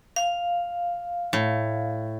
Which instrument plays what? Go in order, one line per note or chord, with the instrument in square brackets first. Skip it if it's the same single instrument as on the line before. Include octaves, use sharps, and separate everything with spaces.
[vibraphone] F5
[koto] A2